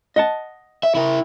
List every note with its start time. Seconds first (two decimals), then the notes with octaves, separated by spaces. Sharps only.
0.16 D#5 F#5 A5
0.83 E5
0.95 E4 A#4